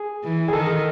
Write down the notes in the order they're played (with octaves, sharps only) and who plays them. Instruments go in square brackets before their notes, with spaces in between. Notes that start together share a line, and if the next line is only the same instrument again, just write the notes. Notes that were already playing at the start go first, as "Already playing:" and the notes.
Already playing: [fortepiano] G#4
[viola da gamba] E3
[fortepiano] G#4
[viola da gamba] D#3 [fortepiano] A4